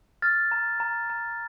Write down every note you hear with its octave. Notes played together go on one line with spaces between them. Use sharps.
F6 A6
A#5
A#5
A#5